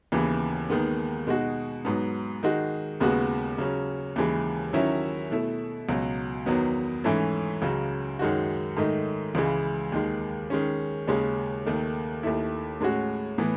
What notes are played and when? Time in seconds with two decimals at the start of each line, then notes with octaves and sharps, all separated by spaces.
0.12 D#2 C#3 E3 B3
0.69 D#2 D#3 G#3 B3
1.27 B2 G#3 D#4 F#4
1.85 G#2 F#3 B3
2.43 D#3 G#3 D#4 F#4
3.00 D#2 C#3 G#3 B3 F#4
3.58 C#3 F#3 C#4
4.16 D#2 C#3 E3 G#3
4.73 D#3 F#3 C#4 E4
5.31 B2 A3 E4
5.89 C#2 B2 F#3
6.46 E2 D#3 F#3 B3
7.04 G#2 E3 A3 C#4 E4
7.62 C#2 C#3 F#3 C#4
8.19 F#2 D#3 G#3 D#4 F#4
8.77 G#2 D#3 A3 D#4
9.35 C#2 C#3 E3 G#3
9.92 D#2 D#3 G#3
10.50 D#3 G#3 C#4
11.08 D#2 C#3 G#3 C#4
11.65 D#2 D#3 A3
12.23 D#2 D#3 A3 E4
12.80 A2 G#3 C#4 F#4
13.38 A2 E3 B3